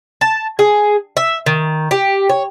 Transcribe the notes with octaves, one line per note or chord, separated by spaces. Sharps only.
A5
G#4
E5
D#3
G4
C#5